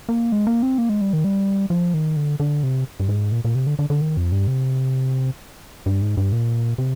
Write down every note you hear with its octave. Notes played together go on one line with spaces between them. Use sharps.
A#3
G#3
A#3
C4
A#3
G#3
G3
D#3
G3
F3
D#3
D3
D3
C3
G2
G#2
A#2
A#2
C3
D3
D3
D3
D#3
F2
G2
C3
G2
G#2
G2
A#2
C3